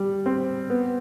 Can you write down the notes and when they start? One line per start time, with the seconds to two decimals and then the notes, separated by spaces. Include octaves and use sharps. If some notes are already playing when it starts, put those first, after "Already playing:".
Already playing: G3
0.26 C4
0.70 B3